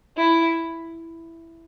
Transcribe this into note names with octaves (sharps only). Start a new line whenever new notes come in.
E4